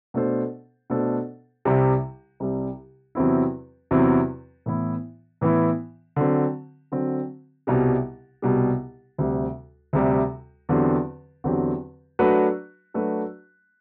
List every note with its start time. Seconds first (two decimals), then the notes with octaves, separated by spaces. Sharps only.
0.14 B2 A3 D4 A4 C5
0.90 B2 A3 D4 A4 C5
1.65 C2 C3 G3
2.40 C2 C3 G3
3.15 E2 C3 F#3 C4 E4
3.91 E2 C3 F#3 C4 E4
4.66 A2 E3 B3 E4
5.41 A2 E3 B3 E4
6.16 D3 F#3 C4
6.92 D3 F#3 C4
7.67 C2 B2 G3
8.42 C2 B2 G3
9.18 D2 C3 G3
9.93 D2 C3 G3
10.69 E2 D3 F#3 C4 G4
11.44 E2 D3 F#3 C4 G4
12.19 F#3 A3 D4 F#4 B4
12.94 F#3 A3 D4 F#4 B4